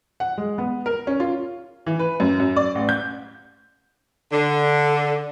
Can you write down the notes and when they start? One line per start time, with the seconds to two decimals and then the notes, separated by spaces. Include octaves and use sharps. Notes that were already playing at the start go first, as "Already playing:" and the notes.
0.20 F#5
0.38 G#3
0.58 B3
0.86 A#4
1.07 C#4
1.20 F4
1.86 E3
1.99 B4
2.20 F#2
2.40 F#2
2.56 D5
2.75 A1
2.89 G6
4.32 D3